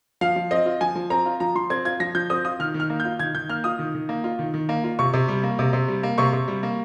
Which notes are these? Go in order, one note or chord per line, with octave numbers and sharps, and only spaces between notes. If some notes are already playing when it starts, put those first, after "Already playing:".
F3 F5
F3
C4 D#5
F4
F3 G#5
F3
C4 A#5
F4
F3 A#5
F3 C6
C4 G#6
F4 G#6
F3 A#6
F3 G6
C4 D#6
F4 D#6
D#3 F6
D#3
F6
A#3
G6
F4
D#3 G#6
D#3 G6
A#3 F6
F4 D#6
D#3
D#3
A#3
F4
D#3
D#3
A#3
F4
C3 C#6
C3
G3
A#3
C3
C3
G3
A#3
C3 C#6
C3
G3
A#3